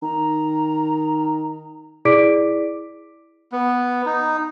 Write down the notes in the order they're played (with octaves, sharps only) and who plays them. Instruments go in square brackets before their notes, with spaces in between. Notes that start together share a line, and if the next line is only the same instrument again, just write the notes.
[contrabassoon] D#3 [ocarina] A#5
[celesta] E4 G#4 D5 D6 B6 D7
[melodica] B3
D#4